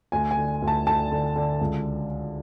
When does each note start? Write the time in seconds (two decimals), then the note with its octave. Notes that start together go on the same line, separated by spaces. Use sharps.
0.12 D2 G#5
0.31 G#5
0.37 D3
0.62 D2
0.68 A5
0.86 D2 A5
1.11 D3
1.36 D3
1.61 C#2